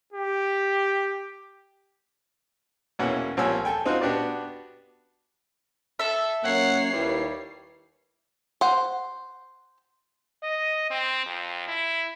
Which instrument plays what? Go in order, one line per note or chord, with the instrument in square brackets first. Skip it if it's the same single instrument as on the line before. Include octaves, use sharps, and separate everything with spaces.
[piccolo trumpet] G4
[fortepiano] E2 B2 E3 A#3 C#4 F#5
C2 F3 A#3 C#5 G#5 E6
A4 G5 G#5
C4 D#4 F4 F#4
B3 D4 F#4 G4 D5
[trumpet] A4 [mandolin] E5
[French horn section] F#2 A#3 C#4 [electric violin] C#5 C7 [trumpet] F#5
[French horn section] D#2 E4 B4 [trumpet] G3
[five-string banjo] C5 F#5
[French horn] D#5
C4
F2
E4